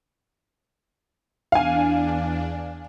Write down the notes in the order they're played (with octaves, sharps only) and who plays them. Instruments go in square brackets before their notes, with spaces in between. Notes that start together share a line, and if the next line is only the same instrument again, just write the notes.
[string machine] E2 D4 [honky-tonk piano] F5 G#5